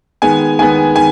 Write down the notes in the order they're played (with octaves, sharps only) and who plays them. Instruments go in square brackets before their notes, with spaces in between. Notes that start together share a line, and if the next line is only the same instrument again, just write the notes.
[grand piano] D#3 G#3 B3 G#5
D#3 G#3 B3 G#5
D#3 G#5